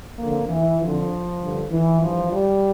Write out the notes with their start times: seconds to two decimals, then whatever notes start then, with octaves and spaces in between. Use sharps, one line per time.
0.19 F2 D3 A#3
0.49 E3
0.80 F2 D3 F3
1.41 G2 D3
1.71 E3
2.01 G2 E3 F3
2.32 G3